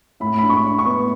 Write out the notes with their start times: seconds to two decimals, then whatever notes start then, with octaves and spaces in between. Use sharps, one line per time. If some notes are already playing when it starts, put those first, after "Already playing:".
0.20 A2 B5
0.38 D4 B5
0.49 C#6
0.64 D4
0.79 C#6
0.86 B3